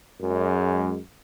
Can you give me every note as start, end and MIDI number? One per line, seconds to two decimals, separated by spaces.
0.22 0.98 42
0.22 0.98 56